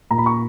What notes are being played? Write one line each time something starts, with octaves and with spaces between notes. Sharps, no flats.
A#2 A#5
B5
C#6